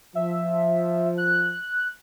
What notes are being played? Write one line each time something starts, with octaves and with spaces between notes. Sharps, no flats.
F3 E5
F#6